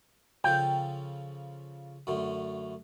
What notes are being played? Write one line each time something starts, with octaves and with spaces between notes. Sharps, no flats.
C#3 F3 A4 G5
F#2 D3 A3